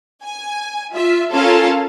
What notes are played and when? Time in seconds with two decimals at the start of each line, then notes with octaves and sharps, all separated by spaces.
0.23 G#5
0.93 F4 E5
1.32 C#4 F4 A4 A#4 F5 A5